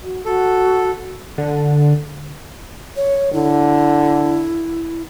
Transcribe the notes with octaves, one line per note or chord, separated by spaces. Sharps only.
F#4
F#4 A4
D3
C#5
D3 E4